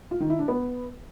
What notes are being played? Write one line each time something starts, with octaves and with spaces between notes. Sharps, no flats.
F4
D#3
E4
D4
B3